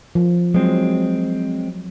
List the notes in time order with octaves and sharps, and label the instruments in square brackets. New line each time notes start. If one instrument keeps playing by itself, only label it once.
[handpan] F3
[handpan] F#3 [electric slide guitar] G#3 C4